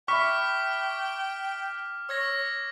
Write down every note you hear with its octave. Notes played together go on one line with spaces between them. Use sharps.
E5 G5 B5 C#6 D6 F6 B6
C#5 E6 G#6 A#6